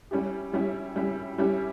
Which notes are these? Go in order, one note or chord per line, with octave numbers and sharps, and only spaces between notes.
G3 C#4 E4 G4
G3 C#4 E4 G4
G3 C#4 E4 G4
G3 C#4 E4 G4